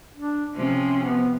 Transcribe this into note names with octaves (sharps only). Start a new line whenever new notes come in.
D4
C3 F3 C#4
B3